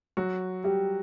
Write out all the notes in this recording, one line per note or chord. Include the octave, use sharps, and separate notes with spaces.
F#3 F#4
G3 G4